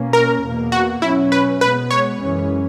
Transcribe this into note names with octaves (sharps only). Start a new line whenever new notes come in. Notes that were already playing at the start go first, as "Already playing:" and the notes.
Already playing: B2 A#3 C#4
A#4
E2 B2 A#3
F#4
B2 F#3 C#4 E4
B4
B2 G#3 B3 B4
C#5
F#2 E3 G#3 C#4